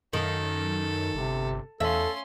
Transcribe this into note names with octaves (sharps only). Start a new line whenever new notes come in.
F#2 D#3 A4
G1 C3
E2 C#4 A4 E5 C6